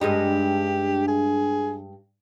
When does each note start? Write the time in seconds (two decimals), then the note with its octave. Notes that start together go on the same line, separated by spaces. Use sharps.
0.01 G2 G#3 D#4 G4
1.08 G#4